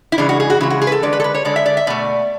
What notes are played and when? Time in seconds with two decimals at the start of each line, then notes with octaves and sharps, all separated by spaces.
0.12 E4
0.18 C#3 E3 G#3 D4
0.29 F#4
0.40 G#4
0.50 F#4
0.60 C#3 E3 G#3 E4
0.70 F#4
0.82 G#4
0.87 B4
0.92 A4
1.02 D3 G#3 D5
1.13 B4
1.20 A4
1.24 B4
1.35 C#5
1.45 D3 G#3 D5
1.56 E5
1.66 D5
1.77 E5
1.87 B2 A3 D5